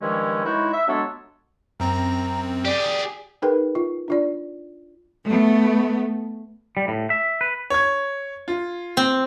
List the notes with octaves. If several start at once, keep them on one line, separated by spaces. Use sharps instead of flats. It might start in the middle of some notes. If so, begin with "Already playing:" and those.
G2 D#3 F3 G#3 C#4 E4
E3 G#3 D#4 E4 F#4 C#5
E5
F#3 G#3 B3 D4 A4 C#5
F#2 C4 A#5
G4 G#4 D5
D#4 G#4 A#4 B4 G5
F4
D4 F4 D5
A3 B3
G3
A2
E5
B4
C#5 G#6
F4
C4